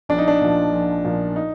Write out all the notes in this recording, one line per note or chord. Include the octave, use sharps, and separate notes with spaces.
A#1 D4
D#4
D4
A#2 F3
A#1
A#2 F3
D#4